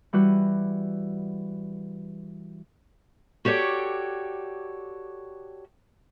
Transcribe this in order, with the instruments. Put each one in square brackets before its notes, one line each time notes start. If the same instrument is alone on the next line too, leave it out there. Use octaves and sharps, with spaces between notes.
[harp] E3 G3 F#4 B4
[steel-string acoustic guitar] F#4 G4 A4 C#5 D5